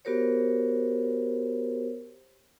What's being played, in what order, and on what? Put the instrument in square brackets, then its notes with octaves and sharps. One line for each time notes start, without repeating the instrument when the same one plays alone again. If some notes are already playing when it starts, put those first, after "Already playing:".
[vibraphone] B3 F#4 G4 A#4 C5 C#5